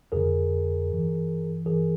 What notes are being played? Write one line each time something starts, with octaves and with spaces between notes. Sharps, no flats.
F2 D3 G#4 A#4
G2 E3
G2 E3 G#4 A#4